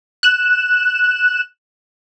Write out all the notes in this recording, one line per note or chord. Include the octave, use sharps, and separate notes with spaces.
F#6 E7